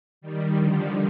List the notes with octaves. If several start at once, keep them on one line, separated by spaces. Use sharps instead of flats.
D#3 G3
D3 F3